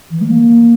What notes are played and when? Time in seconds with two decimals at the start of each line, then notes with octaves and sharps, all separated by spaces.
0.11 E3
0.21 A3
0.28 A#3